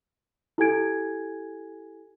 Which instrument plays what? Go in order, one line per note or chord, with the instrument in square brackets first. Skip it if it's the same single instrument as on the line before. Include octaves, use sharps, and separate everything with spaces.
[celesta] E4 G4 A4 G#5 G#6 D7